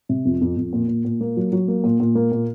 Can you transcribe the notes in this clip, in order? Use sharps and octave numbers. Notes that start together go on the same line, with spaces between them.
C3
F2
F2
F2
A#2
A#2
A#2
A#3
F#3
F#3
A#3
A#2
A#2
A#3
A#2